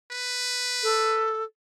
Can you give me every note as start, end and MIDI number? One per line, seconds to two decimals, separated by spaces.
0.11 1.34 71
0.83 1.44 69